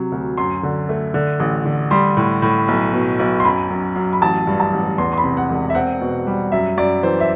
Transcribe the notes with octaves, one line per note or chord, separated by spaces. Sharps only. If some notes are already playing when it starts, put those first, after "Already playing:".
Already playing: C3 F#3
D2
F#2 C6
D3
A3
D3
A1
D3
G3 C6
A2
A2
B1
B2
B1
C6
F#2 B5
F#2
F#2
B5
A1 A5
G2
A5
A1
E2 C6
C6
B5
C3
F#5
E1
E5
C4 F#5
B2
G3
F#2 E5
F#2 D5
E3 C5
E5